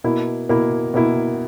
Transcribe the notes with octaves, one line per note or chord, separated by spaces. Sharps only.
B2 A#3 E4
B2 A#3 E4
B2 A#3 E4